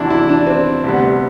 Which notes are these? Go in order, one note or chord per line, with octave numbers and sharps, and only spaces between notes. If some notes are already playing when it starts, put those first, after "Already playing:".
Already playing: E2 C3 F#3 D4 E4
E4
D4
C4
D2 C3 G3 B3